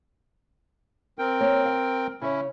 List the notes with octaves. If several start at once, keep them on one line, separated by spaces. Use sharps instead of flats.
C4 A#4 G5
A#3 C#5
F5
C#3 C#4 E4 C#5